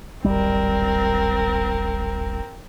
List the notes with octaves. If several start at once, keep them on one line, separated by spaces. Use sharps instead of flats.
D1 G#1 G3 C4 A#4